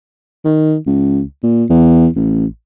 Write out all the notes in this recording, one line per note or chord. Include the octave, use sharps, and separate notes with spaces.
D#3
C#2
A#2
E2
A1